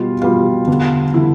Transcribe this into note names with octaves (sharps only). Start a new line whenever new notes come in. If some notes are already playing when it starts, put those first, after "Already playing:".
Already playing: B2 G3 F4
B2 G3 F4
E2 D3 G3
D3 G3 E4